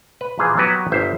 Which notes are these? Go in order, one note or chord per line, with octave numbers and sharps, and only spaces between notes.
B4
A#2 E3 F3 G#4
F#3 A#3 B3 F#4 G4 B4
G1 C5 E5